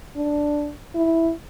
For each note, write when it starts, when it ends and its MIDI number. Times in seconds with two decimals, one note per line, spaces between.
0.17 0.72 62
0.95 1.31 64